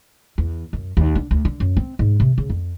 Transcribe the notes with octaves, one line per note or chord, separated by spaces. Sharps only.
E2
F#2
D#2
D3
D2
D3
F#2
C4
G#2
C3
C#3
F2